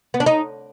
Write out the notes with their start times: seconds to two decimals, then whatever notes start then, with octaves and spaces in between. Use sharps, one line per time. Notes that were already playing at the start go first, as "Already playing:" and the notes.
0.14 B3
0.20 D4
0.26 D#4